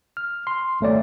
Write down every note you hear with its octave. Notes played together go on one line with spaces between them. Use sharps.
F6
C6
G#1 A3 C#5 D5